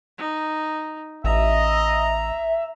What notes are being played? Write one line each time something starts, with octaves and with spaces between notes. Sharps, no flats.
D#4
A1 D#5 E5 A#5